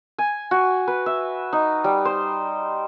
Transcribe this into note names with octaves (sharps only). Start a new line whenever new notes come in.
G#5
F#4
B4
E5
D#4
G3
C5